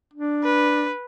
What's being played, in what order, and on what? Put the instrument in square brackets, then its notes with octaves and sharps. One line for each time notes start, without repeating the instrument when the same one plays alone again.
[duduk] D4
[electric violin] B4